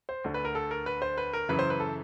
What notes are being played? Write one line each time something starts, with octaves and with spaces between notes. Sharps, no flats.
C5
D2 D3
B4
A#4
A4
A#4
B4
C5
B4
A#4
F#2 C#3 E3 B4
C5
B4
A4